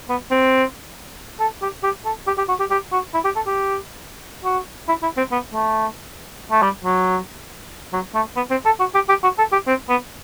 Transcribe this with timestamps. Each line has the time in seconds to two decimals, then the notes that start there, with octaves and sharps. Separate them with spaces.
0.09 B3
0.31 C4
1.40 A4
1.62 G4
1.83 G4
2.05 A4
2.27 G4
2.38 G4
2.49 F#4
2.60 G4
2.71 G4
2.92 F#4
3.14 E4
3.25 G4
3.36 A4
3.47 G4
4.45 F#4
4.88 E4
5.03 E4
5.17 C4
5.32 B3
5.54 A3
6.51 A3
6.62 G3
6.84 F#3
7.93 F#3
8.15 A3
8.36 B3
8.51 C4
8.65 A4
8.80 F#4
8.95 G4
9.09 G4
9.23 F#4
9.38 A4
9.52 G4
9.67 C4
9.89 B3